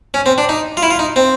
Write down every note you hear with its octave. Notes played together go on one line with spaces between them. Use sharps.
C#4
C4
D4
D#4
F4
E4
F4
D#4
C4